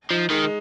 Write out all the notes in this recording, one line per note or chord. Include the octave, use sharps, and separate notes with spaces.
F3 D#4
D#3 G#3
G#3